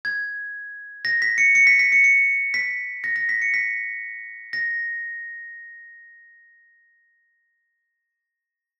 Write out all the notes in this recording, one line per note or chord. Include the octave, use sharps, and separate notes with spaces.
G#6
A#6
B6
C#7
C#7
B6
B6
C#7
C#7
B6
A#6
A#6
B6
C#7
B6
A#6